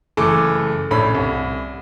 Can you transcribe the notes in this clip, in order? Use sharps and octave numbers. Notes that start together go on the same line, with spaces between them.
F#1 E3 A3 A4 D6
A#1 A2 C#4 B5
C2